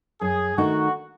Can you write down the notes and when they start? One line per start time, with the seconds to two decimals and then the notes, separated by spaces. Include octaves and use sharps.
0.21 F#2 G#4
0.58 D#3 A3 D#4 F#4